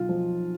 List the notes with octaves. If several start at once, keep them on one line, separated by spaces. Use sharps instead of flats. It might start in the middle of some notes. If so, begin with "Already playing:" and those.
Already playing: B1 F4
F3